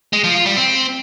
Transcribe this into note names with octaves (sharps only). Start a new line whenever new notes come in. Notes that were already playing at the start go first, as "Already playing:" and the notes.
G#3
F3
F4
G3
C4